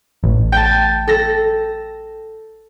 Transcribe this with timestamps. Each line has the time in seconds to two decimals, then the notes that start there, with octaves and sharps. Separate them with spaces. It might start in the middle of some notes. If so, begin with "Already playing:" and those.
0.24 A1
0.52 G5 A5
1.08 A4 A#6